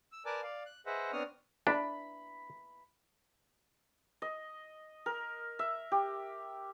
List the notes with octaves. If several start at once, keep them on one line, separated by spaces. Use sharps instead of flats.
E6
A#4 B4 D5 G#5 A5 D6
D5 F5
F#6
G#4 B4 C5 D#5 E5 F#5
B3 C4 D4 C#5 D#6 F6
D4 B5
D#5
A#4
E5
G4